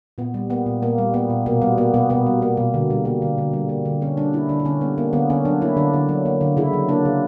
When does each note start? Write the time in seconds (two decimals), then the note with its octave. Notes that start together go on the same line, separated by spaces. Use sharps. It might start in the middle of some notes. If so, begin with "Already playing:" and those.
0.18 A#2 B3
0.34 G3
0.50 A#3 B3
0.66 A#2
0.82 A#2 A#3
0.98 G3
1.14 A#3 B3
1.30 A#2
1.46 B2 A#3
1.61 G3 B3
1.78 A#3 B3
1.94 B2 B3
2.10 B2 B3
2.27 G3
2.42 A#3
2.57 B2
2.74 D3
2.90 G3
3.05 A#3
3.22 D3
3.38 D3
3.53 G3
3.69 A#3
3.85 D3
4.01 D3 C#4
4.17 G3 D4
4.33 A#3 E4
4.49 D3 D4
4.59 D4
4.65 D3 C#4
4.81 G3 B3
4.98 A#3
5.13 D3 B3
5.30 D3 C#4
5.45 F#3 D4
5.61 A#3 E4
5.77 D3 D4
5.94 D3
6.09 F#3
6.25 A#3
6.41 D3
6.57 C#3 E4
6.73 F#3
6.89 A#3 D4
7.05 C#3